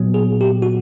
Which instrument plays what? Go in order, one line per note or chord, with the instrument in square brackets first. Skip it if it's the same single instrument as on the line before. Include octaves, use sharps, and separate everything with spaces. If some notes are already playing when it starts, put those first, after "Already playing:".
Already playing: [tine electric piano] A#2 F#3 B3
G#4
G4
F#4